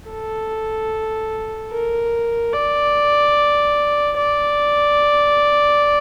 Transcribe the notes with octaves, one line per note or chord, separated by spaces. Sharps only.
A4
A#4
D5
D5